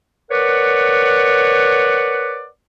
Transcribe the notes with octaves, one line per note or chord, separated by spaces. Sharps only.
A#4 B4 C#5 D5 F#5